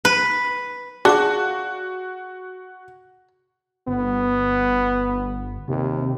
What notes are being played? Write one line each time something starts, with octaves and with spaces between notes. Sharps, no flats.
B4
D4 F#4 G#4 F5 D6
G1 B3
D#2 C3